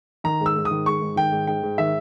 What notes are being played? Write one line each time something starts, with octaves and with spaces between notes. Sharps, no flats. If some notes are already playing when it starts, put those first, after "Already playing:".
D#3 A#5
G#2
E6
G#2
D#6
D#3
G#3 C#6
G#2
D#3 G5
G#2
G#2 G5
G#2
D#3 E5